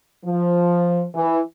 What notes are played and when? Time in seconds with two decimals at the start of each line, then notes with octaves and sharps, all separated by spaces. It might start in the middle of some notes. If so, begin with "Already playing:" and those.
0.25 F3
1.14 E3